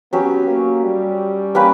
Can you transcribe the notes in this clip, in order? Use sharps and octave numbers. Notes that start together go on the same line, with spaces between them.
F#3 B3 C#4 G4
A#3
G3
A#3 C#4 G4 B4